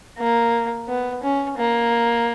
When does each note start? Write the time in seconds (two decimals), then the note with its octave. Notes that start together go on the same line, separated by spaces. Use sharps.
0.19 A#3
0.88 B3
1.23 C#4
1.57 A#3